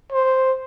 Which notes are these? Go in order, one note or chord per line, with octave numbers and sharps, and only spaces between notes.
C5